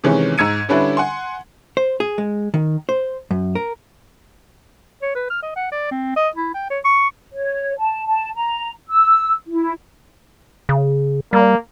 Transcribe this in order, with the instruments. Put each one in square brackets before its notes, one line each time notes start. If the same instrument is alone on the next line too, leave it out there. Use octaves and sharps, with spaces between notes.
[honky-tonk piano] C3 D#3 E3 G#3 C#4
G#2 A#5 E6 G#6 C#7 D#7
D3 G3 C#4 D4 E4 B4
F#5 G#5 C6
[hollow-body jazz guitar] C5
G#4
G#3
D#3
C5
F#2
A#4
[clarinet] C#5
B4
F6
D#5
F#5
D5
C4
D#5
E4
G5
C#5
C#6
[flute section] C#5
A5
A5
A#5
E6
E4
[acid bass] C#3
[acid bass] G3 [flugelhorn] A#3